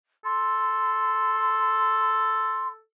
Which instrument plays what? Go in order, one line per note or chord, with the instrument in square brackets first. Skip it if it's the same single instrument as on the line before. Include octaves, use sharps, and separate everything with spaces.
[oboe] A4 [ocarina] C6